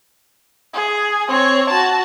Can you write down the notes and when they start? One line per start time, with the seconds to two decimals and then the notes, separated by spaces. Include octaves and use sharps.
0.73 G#4
1.29 C4 C#5
1.70 F#4 A5